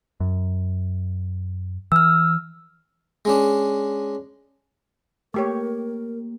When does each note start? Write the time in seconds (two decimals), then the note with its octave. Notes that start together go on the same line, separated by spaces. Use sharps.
0.20 F#2
1.92 E3 E6 F6
3.25 G#3 C#4 D4
5.34 A3 A#3 G4 A#4 C#5